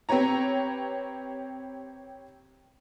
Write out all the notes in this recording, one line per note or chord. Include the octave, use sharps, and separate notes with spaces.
C4 G4 B4 C#5 A#5